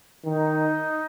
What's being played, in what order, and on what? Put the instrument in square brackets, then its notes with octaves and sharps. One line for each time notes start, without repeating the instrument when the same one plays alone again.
[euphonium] D#3 [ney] D#4